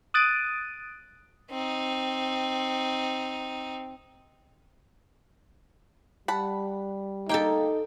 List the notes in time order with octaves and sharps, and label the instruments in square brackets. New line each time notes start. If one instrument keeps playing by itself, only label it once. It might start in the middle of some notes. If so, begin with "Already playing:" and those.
[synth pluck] D#6 F#6 A6 D7 D#7
[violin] C4 D#4
[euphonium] G3 [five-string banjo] F#5 A5 B5
[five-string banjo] A#3 G4 [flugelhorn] D#4 [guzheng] A4 G5